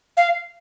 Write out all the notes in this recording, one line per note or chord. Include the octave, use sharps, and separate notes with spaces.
F5